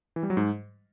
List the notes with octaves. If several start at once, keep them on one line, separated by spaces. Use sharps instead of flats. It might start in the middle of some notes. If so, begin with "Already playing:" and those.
E3
G3
F#3
G#2